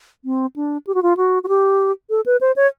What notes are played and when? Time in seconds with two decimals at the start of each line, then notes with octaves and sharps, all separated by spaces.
0.25 C4
0.56 D4
0.87 G4
0.94 F#4
1.03 F4
1.17 F#4
1.44 F#4
1.48 G4
2.10 A4
2.26 B4
2.41 C5
2.56 C#5